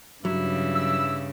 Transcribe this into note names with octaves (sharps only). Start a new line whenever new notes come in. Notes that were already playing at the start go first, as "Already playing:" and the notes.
G2 C#3 F#3 E4
E6